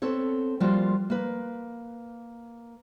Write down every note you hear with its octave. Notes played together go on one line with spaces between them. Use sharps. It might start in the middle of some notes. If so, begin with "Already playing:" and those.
B3 C4 A4 C#5
F3 G3 A#3 F4 F#4
A#3 B4